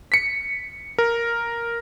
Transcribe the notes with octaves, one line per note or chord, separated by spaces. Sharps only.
B6 C#7
A#4